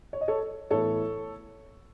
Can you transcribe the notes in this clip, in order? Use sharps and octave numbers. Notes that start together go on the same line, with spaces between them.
C#5
D#5
A4 C#5
A2 E3 B3 E4 A4 C#5